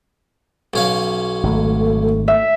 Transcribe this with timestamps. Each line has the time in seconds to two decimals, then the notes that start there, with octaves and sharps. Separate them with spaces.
0.74 B1 C#4 F5
1.43 G#1 A3
2.28 E5